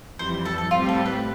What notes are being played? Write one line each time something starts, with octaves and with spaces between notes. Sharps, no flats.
F2 E3 G3 C5
A4
A4
A2 G3 C4 F4 G4
A4
B4